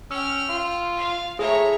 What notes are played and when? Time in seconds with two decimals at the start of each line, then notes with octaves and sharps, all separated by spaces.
0.11 C#4 G5 E6 F6
0.49 F4
0.97 F5
1.39 A2 G#4 C#5 E5 A#5